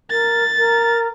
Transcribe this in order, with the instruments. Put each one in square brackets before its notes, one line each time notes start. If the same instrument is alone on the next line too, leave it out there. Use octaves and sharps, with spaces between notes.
[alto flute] A#4 [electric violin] A6
[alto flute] A#4